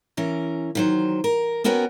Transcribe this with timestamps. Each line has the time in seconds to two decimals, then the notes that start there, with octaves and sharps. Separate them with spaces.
0.17 E3 C#4 A#4
0.75 D#3 F#3 C5
1.24 A#4
1.64 B3 C#4 F#4 A#4 B4 G5